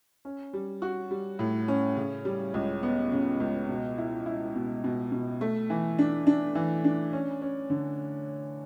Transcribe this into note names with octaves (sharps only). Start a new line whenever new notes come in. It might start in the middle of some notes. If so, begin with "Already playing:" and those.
C#4
G3
F#4
G3
A2
C#4
C#3
G3
C#2
B3
C#3
C#2
B2
E4
E4
B2
B2
B2
A3
E3
D4
D4
E3
D4
C#4
C#4
D3